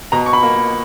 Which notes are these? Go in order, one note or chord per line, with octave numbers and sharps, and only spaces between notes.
B2 A#5
C#6
B5
A#3